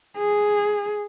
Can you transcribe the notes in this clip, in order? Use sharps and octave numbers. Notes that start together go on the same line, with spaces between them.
G#4